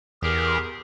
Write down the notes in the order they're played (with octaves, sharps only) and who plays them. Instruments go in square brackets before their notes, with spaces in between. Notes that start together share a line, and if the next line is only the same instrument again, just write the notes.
[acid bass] E2 [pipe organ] G4 G#4 A#4